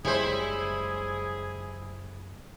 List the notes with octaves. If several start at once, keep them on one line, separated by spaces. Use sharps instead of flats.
F#1 G3 G#3 E4 G#4 C5 C#5